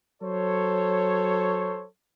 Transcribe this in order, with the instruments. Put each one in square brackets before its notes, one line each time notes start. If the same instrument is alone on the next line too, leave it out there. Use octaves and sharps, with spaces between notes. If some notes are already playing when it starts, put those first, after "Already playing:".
[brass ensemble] F#3 A4 C5 C#5